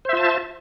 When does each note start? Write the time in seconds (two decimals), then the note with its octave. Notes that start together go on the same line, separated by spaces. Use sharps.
0.05 C5
0.09 E5
0.13 F4
0.17 A5